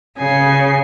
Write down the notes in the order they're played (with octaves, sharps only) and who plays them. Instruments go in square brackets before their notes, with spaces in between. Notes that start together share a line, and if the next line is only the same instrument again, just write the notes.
[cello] C#3 [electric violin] G#5 C7